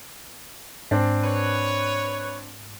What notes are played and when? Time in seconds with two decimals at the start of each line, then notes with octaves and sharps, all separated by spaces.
0.91 G#2 C4 D4
1.24 B4 C#5